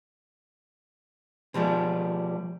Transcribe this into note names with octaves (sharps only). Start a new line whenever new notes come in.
B2 F3 G3 G#3